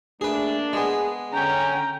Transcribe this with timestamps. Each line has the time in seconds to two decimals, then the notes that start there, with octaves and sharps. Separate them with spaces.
0.21 A3 A#3 D4 G#4 B4
0.73 G#3 B3 G#4
1.33 D3 C#4 G5 A#5